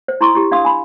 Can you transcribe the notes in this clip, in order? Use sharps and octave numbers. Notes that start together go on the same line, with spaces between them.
C5
E4 A#5 C6 C#6 D#6
E4 G4
D4 F5 C6 D#6
G#5 B5